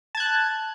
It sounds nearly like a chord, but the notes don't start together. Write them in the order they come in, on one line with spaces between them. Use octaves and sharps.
A5 G#6 F#6